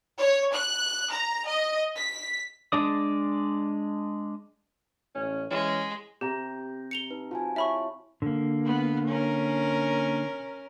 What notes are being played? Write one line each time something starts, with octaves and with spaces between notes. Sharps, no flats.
C#5
F#6
A#5
D#5
B6
G#3 D4 D5 D#6
A1 C#4
E3 G#3 C#4
C3 G4 A#5 G6
C#7 F7 G7
D#4 B4
F3 F4 F#4 G#5
E4 C#5 E5 B5 C#6
D3 A#3
B3
C#4 A#4